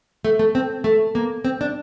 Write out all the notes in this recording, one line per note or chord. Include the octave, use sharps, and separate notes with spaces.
A3
A3
C4
A3
A#3
C4
D4